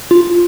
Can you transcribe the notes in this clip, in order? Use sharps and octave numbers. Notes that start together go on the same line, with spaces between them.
F4